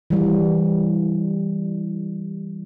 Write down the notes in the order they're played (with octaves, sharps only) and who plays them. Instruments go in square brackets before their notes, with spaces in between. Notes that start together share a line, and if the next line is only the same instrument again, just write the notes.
[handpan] E3 G3